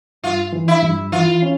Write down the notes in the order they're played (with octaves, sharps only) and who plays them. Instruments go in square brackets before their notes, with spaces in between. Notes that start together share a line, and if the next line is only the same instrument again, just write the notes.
[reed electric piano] G2 [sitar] F4
[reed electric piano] E3
[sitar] E4
[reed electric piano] G2
[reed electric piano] E3 [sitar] F4
[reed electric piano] C#4